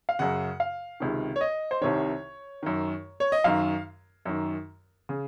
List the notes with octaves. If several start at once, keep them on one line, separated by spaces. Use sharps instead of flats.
F5
F#2 C#3 F#5
F5
C#2 C3 D#3
C#5
D#5
C5
C2 C3 D#3 C#5
F#2 D#3
C#5
D#5
F#2 D#3 F5
F#2 D#3
C#3